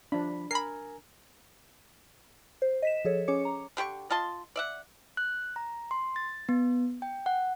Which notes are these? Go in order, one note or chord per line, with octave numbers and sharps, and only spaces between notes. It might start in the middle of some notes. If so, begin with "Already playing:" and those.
F3 D4 B5
A#4 G#5 A#5 B5 C7
C5
D#5 B6 E7
F3 G#4 A4 C#5
C#4 G#4 C#5 D6 C#7
A#5
D3 G4 G5 C#6
F4 D#5 A5 C6
D5 E5 F#5
F#6
A#5
C6
A6
B3
G5
F#5